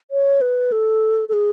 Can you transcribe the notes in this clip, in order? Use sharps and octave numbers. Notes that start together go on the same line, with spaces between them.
C#5
B4
A4
A4
G#4